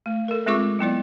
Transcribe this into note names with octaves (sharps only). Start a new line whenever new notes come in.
A3
A4 A#4
G#3 C4 F4 G#4 C#6 D6
F#3 B3 E4 D5